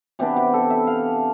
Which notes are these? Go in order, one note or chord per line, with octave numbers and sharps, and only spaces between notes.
C3 E3 B3 D4 G4
G4
A4
E5
F5